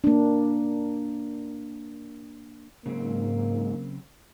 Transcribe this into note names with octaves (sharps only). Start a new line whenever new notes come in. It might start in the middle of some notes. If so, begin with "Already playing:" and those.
A#3 D4
G#2 C#3 F#3 A#3 C4